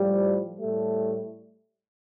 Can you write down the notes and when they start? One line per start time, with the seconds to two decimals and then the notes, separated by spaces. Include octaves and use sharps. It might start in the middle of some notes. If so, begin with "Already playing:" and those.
Already playing: A2 F3 G3
0.60 A2 G3 A3